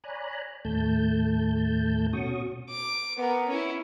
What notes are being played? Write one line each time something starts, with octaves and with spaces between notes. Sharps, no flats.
C#5 D5 G#5 A#5 B5 F#6
D#2 A2 A3 A5 G6
B2 C#4 F#4 C#6 D#6
D6
B3 A#4
C#4 E4